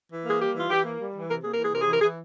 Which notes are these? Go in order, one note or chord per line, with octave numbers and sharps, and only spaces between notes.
E3
A#3 G#4
G3 G4
E3 F4
E3 G4
A#3
G3
E3
C3 A#4
A#3 G#4
A#4
E3 G#4
C3 A#4
G#4
E3 A#4
E3 G#4